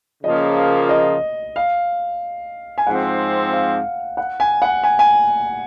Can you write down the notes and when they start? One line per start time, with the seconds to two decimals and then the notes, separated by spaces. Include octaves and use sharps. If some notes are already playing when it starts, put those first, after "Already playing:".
0.23 C#3 F3 A#3 D#5
0.89 D#5
1.56 F5
2.78 G#5
2.87 G#2 F3 C4 F#5
3.53 F5
4.17 F#5
4.40 G#5
4.62 F#5
4.83 G#5
4.99 G#5